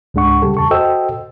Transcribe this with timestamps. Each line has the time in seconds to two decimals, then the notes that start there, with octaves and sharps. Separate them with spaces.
0.14 C#2 G#2 G#3 D4 F#5 C#6
0.42 C#3 G3 G4 A4
0.57 E2 A5 C#6
0.71 F#4 A4 C5 D#5 G5 E6